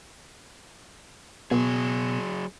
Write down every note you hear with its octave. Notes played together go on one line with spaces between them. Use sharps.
B2 F#3 G#4